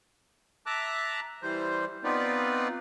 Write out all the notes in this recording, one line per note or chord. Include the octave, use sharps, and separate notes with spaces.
E5 A5 A#5 D6 F#6
E3 G3 C5
B3 C4 D#4 F4 B4 D5